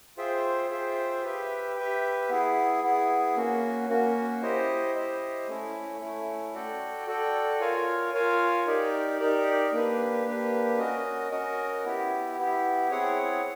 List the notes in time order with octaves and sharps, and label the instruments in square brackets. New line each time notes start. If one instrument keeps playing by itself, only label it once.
[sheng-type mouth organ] F4 G#4 C5 E5 G5
F4 G#4 C5 E5 G5
G4 B4 E5 G5
G4 B4 E5 G5
B3 E4 G#4
B3 E4 G#4
A#3 C#4 F#4
A#3 C#4 F#4
E4 G4 C5 D#5
E4 G4 C5 D#5
A3 C#4 E4
A3 C#4 E4
F#4 A4 D5 G5
F#4 A4 D5 G5
F4 A#4 C#5 F5 G#5
F4 A#4 C#5 F5 G#5
D#4 G4 A#4 D5
D#4 G4 A#4 D5
A#3 D4 G4 B4
A#3 D4 G4 B4
C#4 F#4 A#4 D#5
C#4 F#4 A#4 D#5
B3 E4 G4
B3 E4 G4
C4 E4 G#4 C#5 F#5